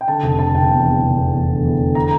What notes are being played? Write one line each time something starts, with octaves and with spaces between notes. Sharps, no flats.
G5
D3 A5
F1
D3 A5
F1 G5
E2
E2
F1
E2
E2
D3
E2
D3
A#5